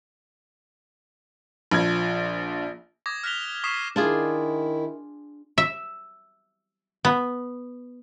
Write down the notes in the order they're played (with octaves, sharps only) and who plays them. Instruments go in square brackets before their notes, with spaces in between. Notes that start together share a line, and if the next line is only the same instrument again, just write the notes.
[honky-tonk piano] A#1 F3 G#6
[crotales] D6 D#6 G#6 A#6
F6 F#6 A#6 B6 F7 G7
C#6 D#6 B6 C7 E7
[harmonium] D#3 E4 [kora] D4 F4 G#4
[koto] E5
B3